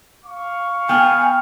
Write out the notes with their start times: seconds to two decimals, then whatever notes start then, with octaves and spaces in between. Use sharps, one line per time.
0.24 F5 C#6
0.89 B3 G5 G#5 F6